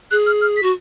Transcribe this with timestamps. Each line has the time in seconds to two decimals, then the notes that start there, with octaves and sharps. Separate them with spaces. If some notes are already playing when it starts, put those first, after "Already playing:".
0.11 G#4 F#6
0.26 F6
0.41 F6
0.57 B6
0.63 F#4